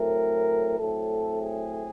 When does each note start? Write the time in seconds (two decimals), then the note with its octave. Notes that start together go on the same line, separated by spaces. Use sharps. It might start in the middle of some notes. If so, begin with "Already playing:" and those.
Already playing: A2 F#3 A3 C4 A#4
0.78 A2 F#3 A3 C4 A4
1.41 G#4